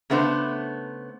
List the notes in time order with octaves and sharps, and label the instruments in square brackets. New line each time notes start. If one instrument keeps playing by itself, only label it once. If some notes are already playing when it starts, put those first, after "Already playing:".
[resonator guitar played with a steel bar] C#3 A3 B3 D4 C5